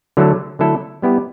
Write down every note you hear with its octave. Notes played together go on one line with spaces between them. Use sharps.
D3 F#3 A3 E4 A4
D3 F#3 A3 E4 A4
G3 B3 E4 G4